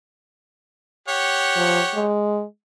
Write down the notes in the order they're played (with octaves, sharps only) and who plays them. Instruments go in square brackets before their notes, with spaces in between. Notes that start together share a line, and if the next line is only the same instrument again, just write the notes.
[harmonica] G4 C#5 F#5
[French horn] F3
G#3